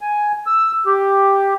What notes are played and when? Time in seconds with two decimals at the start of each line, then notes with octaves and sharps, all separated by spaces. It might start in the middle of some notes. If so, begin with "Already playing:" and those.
0.01 G#5
0.46 E6
0.86 G4